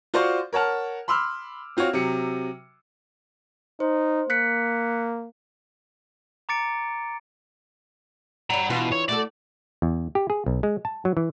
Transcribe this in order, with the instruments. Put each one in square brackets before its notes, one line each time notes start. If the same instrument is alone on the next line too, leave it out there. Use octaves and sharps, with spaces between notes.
[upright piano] F4 F#4 C5 D5 C#6
A#4 C#5 F#5 A5 F6
B5 C6 D6 E6 F6
C4 F4 F#4 C#5
C3 F#3 C#7
[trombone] D#4 [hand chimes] C5
[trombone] A#3 [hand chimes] F#6 B6 C#7
[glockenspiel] A#5 D6 A6 C#7 D7
[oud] G2 G3 [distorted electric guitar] F#5 A#5
[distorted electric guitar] B2 [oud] E3 F4 G4
[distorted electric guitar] C#5
[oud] A3 F#4 A4 [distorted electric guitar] D5
[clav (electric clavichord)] E2
G4
G#4
B1
G#3
A5
F#3
E3